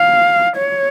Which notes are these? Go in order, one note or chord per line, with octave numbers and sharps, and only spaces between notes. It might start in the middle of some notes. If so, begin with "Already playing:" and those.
Already playing: F5
C#5